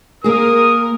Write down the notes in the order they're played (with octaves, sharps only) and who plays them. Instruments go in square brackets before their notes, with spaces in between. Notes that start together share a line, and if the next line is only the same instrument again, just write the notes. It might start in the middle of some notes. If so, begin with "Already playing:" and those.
[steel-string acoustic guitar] A#3 G#4 [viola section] A#4 [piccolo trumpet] D#6